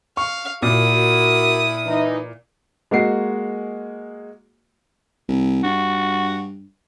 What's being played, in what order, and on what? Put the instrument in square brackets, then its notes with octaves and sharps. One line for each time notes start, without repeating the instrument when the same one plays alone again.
[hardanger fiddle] F5 [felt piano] C#6
[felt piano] A#2 [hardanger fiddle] E4 D#6 [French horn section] F#4 A#4
[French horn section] E3 D#4
[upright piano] G#3 A#3 F#4 C7
[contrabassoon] C2
[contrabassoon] G2 [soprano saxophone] F#4